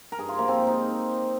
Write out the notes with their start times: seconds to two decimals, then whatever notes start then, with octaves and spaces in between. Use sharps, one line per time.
0.12 A#4
0.18 G2 G#4
0.28 F4
0.38 F3 A#3
0.48 C4
0.58 G#2
0.67 D#4